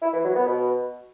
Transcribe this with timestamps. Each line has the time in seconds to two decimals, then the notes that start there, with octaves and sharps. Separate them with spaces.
0.02 E4
0.13 E3
0.24 F#3
0.36 B3
0.47 B2